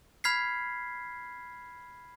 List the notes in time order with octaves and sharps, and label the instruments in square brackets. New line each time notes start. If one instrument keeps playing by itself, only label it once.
[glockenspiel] B5 F6 G#6 B6 C7